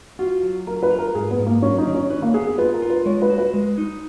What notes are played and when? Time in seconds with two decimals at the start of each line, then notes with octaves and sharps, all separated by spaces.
0.19 F4 F#4
0.43 F#3
0.67 F4 A#4
0.83 B4
0.90 F4
0.99 A#4
1.15 G#2 G#4
1.31 B3
1.39 G#2
1.46 A#3
1.62 F#3 C#4
1.78 D#4
1.87 D#3
1.94 C#4
2.10 C#4 B4
2.22 A#3
2.34 B3 G#4
2.47 G#4
2.58 F4 B4
2.74 A#4
2.82 F4
2.90 B4
3.06 G#3 C#5
3.22 B4
3.30 F#4
3.38 B4
3.54 G#3
3.78 D#4